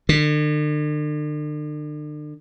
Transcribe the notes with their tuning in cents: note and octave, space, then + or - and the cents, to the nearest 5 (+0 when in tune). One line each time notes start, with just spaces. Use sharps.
D3 +40